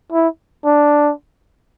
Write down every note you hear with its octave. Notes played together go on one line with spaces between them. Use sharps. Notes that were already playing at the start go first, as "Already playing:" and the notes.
E4
D4